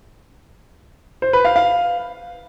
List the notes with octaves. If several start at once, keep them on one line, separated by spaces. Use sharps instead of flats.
C5
B4
F5
F5